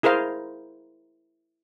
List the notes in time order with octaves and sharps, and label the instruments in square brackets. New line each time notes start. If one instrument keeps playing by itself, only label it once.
[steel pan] E4 G#4 A#4 C5 F5